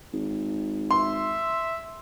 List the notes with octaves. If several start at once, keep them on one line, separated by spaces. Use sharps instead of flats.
G#1
E5 C6